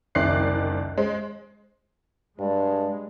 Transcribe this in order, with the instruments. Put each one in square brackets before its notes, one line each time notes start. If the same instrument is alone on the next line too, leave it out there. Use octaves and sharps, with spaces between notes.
[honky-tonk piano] F#1 C2 D#3 D5 F#6 C7
G#3 C5
[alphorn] G2 [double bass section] G#3 [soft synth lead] D5